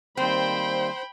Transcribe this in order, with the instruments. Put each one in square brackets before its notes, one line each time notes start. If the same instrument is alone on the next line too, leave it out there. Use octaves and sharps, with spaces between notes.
[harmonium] D#3 G3 A#3 [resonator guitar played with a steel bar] C4 [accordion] C5 C6 [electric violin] G5 B5